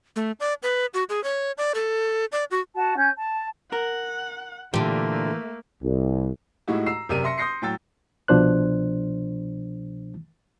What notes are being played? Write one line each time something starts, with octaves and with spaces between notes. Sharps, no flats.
A3
D5
B4
F#4
G#4
C#5
D5
A4
D5
F#4
F#4 A5
C#4 G#5 G6
A5
A#4 F#5
A#2 D3 E3 A3 A#3 G4
C2
A2 G#3 D#4 E4 F#4 G4
A#5 E6 C7 E7
F#1 C3 G4 A#4 D5 D#7
E5 C6 A#6 C#7
C6 D#6 G6 A#6 C7 C#7
A2 F#3 G5 E6 A6
C2 B2 F3 D4 C5 F#6